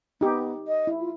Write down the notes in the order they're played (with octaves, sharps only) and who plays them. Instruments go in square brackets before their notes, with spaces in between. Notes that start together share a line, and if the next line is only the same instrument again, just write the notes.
[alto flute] B3 [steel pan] D#4 G4
[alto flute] D#5
[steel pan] E4
[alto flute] F4